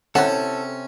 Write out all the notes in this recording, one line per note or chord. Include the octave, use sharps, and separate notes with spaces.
C3 E3 C#4 A4 F#5 A5